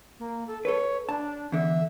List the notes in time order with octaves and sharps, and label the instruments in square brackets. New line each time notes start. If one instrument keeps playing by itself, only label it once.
[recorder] A#3
A4
[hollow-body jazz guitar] A4 B4 [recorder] C#5
[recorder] D4 [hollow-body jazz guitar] A5
[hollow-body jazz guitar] E2 D3 [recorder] E5